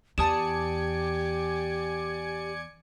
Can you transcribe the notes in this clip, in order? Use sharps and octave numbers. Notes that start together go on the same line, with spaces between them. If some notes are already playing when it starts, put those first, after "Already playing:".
E2 G4 D5 G#5 A5 D#6 C#7 E7